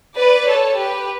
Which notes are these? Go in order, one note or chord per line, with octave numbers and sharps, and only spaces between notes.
B4 D5
A4 C#5
G4 B4